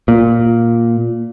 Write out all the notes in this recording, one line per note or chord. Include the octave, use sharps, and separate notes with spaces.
A#2